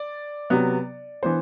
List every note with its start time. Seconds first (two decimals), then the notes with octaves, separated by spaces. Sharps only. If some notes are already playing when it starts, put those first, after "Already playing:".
Already playing: D5
0.50 C3 F#3 B3
1.22 E3 B3 D4 C5